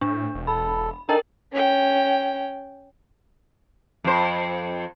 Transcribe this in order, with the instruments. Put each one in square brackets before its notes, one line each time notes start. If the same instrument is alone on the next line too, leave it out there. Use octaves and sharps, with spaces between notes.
[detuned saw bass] A2 [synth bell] D4
[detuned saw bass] E1
[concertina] A4 [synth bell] B5
[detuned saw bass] D4 [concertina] D#4 A4 [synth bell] A#4 G5 A#5
[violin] C#4 G5
[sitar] F2 C5